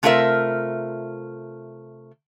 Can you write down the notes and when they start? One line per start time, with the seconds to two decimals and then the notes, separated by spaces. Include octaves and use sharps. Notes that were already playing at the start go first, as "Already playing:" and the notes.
0.03 C3 A3 F4 G#4 A#4 E5